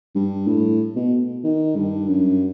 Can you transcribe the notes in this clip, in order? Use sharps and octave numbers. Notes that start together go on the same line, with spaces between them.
G2
A2
B2
D#3
G2
F#2